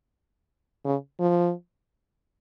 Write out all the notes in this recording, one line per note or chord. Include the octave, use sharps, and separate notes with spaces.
C#3
F3